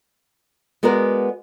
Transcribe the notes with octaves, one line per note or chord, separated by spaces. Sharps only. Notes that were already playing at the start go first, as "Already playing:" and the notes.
G#3 B3 F#4 A#4 D5